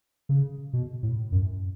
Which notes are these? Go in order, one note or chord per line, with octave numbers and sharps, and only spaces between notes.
C#3
B2
A2
F#2